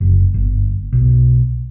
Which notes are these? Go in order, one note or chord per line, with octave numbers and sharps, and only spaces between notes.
F#1
G1
B1